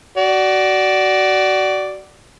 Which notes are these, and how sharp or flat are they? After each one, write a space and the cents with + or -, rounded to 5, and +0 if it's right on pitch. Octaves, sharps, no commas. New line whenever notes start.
F#4 +25 D5 +0